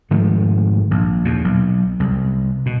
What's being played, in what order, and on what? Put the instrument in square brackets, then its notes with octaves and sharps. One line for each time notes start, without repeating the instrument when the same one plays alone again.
[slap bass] G#2 D#3 F3 A3
A#1
D#2 A#2
B1
C2
B2